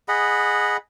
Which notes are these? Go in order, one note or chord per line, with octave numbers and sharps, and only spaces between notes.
G#4 D#5 F#5 B5